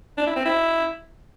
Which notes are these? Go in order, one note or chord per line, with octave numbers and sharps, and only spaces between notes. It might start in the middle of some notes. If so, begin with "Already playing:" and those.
D4
E4
C4
E4